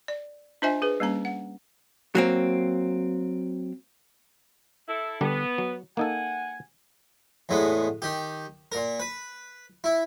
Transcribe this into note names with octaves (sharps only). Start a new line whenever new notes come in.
D5
D4 F4 C5 D#5 E5 G#5
G#4 B4
G3 A#3 C#4 A#5
F#5
F#3 A#3 C4
E4 A4
D3 G3 B3 D4
F#3
A#3 D#4 A4 F#5 G#5
E2 A2 G#3 B3
D#3 G4
A#2 A#4
B4
E4